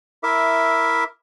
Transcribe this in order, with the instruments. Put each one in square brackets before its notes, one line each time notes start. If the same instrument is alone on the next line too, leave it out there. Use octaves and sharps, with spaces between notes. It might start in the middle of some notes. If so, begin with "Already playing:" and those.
[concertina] E4 A#4 E5 D6